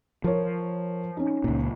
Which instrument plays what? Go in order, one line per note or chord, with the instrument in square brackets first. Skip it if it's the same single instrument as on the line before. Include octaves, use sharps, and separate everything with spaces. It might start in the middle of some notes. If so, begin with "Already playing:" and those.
[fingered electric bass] F3 [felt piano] A#4 C#5
[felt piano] C#4 D#4
[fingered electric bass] C#2 A#2